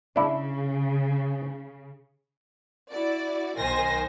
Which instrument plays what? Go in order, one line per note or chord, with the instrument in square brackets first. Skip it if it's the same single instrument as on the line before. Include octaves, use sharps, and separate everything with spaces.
[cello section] C#3 [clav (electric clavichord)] D4 E4
[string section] E4 F#4 D5
B1 D#3 C5 G#5 C6 A#6